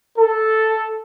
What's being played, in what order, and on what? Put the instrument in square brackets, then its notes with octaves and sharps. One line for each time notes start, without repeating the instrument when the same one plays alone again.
[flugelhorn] A4